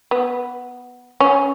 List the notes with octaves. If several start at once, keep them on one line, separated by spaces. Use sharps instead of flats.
B3
C#4